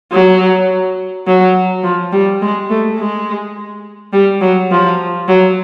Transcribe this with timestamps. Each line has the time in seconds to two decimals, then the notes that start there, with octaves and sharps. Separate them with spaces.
0.12 F#3
1.27 F#3
1.84 F3
2.12 G3
2.42 G#3
2.70 A3
2.98 G#3
4.13 G3
4.41 F#3
4.71 F3
5.28 F#3